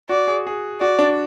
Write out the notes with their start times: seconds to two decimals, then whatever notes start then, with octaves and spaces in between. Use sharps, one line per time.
0.09 F#4 D5
0.27 G#4
0.47 G#4
0.81 F#4 D5
0.99 D4